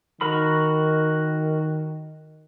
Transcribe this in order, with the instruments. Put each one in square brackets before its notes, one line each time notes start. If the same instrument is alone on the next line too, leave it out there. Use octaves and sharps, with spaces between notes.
[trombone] D#3 [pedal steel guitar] F#4 A#4 B5